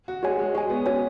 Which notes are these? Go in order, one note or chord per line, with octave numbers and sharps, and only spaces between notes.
F#4
G#3 F#4 C#5 G#5
G#3
G#3 F#4 C#5 G#5
B3
C#4 F#4 C#5 G#5